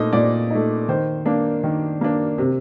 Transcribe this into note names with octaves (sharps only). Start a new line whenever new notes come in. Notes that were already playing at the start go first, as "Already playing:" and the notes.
Already playing: A#2 A3 D#4 D#5
A#2 D5
A3 D#4
D#3 C5
A#3 D4
D#3
A#3 D4
C3